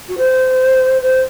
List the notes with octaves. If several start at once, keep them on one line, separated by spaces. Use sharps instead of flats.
F#4
C5
C5